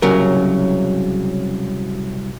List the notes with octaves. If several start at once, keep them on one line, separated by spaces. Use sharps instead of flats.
C2 C#3 F#3 A#4